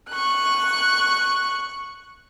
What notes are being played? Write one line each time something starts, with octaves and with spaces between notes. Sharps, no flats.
C#6 F#6